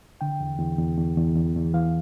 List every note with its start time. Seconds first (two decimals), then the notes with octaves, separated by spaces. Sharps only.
0.21 D3 G5
0.40 E2
0.59 E2
0.79 E2
0.97 E2
1.17 E2
1.36 E2
1.56 E2
1.74 E3 F5